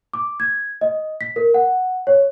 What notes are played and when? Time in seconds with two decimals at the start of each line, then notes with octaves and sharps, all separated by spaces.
0.13 D6
0.40 G#6
0.81 D#5
1.21 B6
1.36 A#4
1.54 F#5
2.07 C#5